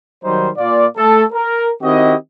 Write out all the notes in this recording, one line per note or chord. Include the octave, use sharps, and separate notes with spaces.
D#3 F#3 G3 D#4 C5
A#2 F4 D5
A3 A4
A#4
D#3 C4 E4 F#4 G4 D#5